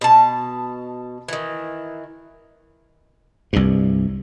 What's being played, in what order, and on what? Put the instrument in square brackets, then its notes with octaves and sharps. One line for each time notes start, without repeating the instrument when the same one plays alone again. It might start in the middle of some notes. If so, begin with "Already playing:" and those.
[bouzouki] B2 A5
D#3 E3
[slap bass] C2 G2